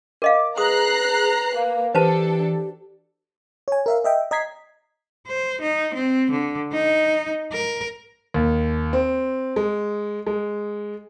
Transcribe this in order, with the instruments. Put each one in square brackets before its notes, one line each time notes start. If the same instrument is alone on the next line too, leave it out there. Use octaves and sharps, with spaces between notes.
[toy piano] A#4 D#5 F5 [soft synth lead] D6
[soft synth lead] G#4 [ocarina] B4 [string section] A#5 F#6 C7 [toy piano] D#6
[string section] A#3 [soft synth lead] F5
[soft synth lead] E3 [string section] D4 A4 [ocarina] G4 [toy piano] B4 C5 A5
[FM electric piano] C#5 G#5
A#4 E5 F5
D#5 E5 G5
D#5 A#5 G#6 B6 C7
[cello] C5
D#4
C4
D3
D#4
A#4
[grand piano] D#2
C4
G#3
G#3